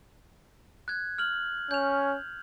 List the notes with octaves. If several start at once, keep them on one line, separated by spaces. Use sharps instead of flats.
F#6 G#6
F6 F#7
C#4 G6 F7